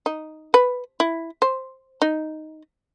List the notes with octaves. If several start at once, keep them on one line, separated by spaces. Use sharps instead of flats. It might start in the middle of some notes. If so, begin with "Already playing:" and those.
D#4
B4
E4
C5
D#4